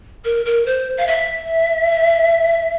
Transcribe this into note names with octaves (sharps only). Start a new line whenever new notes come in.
A#4
A#4
C5
F5
E5